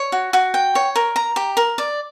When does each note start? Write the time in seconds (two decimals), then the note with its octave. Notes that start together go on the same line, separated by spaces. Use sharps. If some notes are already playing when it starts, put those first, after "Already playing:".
Already playing: C#5
0.12 F#4
0.33 F#4
0.54 G5
0.75 C#5
0.96 A#4
1.16 A#5
1.36 G4
1.57 A#4
1.78 D5